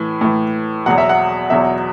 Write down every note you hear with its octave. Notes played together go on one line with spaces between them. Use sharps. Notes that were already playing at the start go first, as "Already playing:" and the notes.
Already playing: A2 E3
A2 E3
E2 B2 F#3 F#5
E5
F#5
E2 B2 F#3 E5